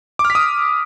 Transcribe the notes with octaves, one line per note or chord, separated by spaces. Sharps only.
D6
F6
B6
D#6